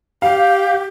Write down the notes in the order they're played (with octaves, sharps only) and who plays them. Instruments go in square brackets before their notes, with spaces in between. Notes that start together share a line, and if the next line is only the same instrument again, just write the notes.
[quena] G4 [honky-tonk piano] F5